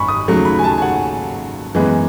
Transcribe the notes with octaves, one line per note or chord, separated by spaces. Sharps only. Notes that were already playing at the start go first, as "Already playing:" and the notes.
Already playing: G#1 F#2 G#5 B5 C#6
D#6
D#2 C#3 F#3 A3
B5
G#5
A5
G#5
F#5
F#2 E3 G#3 B3